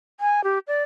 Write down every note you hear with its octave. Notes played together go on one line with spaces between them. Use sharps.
G#5
G4
D5